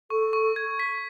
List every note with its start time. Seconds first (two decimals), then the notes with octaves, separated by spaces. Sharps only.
0.10 A4 C#6
0.33 C#6
0.56 G#6
0.79 B6